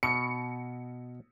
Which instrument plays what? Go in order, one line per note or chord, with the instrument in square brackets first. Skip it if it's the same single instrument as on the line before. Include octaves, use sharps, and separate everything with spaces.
[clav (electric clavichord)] B2 [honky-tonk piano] C#7